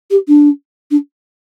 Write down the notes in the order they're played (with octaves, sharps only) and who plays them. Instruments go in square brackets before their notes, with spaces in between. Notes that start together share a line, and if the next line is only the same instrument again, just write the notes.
[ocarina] G4
D4
D4